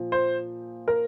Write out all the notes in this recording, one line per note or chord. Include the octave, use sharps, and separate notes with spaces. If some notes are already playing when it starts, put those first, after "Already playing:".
Already playing: A#2 F3
C5
A#4